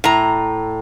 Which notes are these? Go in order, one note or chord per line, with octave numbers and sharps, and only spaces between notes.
A2 A#5